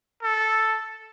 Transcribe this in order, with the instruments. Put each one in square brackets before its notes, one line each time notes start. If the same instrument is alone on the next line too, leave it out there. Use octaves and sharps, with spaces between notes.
[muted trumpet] A4